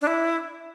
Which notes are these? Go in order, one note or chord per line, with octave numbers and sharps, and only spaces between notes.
D4
E4